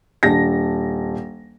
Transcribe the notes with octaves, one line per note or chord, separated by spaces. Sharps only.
D#1 D4 A#6